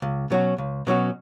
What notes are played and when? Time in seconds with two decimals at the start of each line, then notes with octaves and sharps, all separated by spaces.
0.02 C#2
0.30 B2 F#3 C#4 F#4
0.58 C#2
0.87 B2 F#3 C#4 F#4